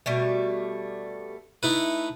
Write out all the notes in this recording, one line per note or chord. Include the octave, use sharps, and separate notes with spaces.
B2 G3 A3
A3 D#4 E4 B4